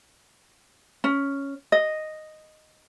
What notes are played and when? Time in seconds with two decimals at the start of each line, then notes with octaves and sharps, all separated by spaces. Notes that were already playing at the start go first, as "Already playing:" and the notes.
1.04 C#4
1.72 D#5